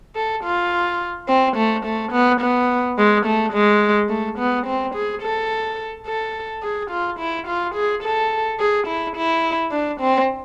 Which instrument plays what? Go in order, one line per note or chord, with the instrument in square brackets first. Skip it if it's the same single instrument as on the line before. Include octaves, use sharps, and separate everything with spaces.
[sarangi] A4
F4
C4
A3
A3
B3
B3
G#3
A3
G#3
A3
B3
C4
G#4
A4
A4
G#4
F4
E4
F4
G#4
A4
G#4
E4
E4
D4
C4